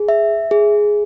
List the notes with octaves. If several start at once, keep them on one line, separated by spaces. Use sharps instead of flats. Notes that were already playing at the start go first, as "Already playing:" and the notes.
Already playing: G#4
E5
G#4